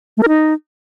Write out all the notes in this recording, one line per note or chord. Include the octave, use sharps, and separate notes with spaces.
A3
A#4
D#4